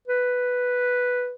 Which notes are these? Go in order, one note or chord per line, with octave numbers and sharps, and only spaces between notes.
B4